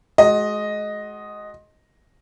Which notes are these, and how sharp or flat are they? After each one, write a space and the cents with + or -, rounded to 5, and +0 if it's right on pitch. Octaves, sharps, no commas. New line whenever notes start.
G#3 +30 F#4 +5 D#5 +0